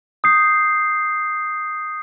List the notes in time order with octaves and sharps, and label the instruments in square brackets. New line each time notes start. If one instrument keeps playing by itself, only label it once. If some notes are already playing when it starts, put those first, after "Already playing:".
[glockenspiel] D#6 G6 C7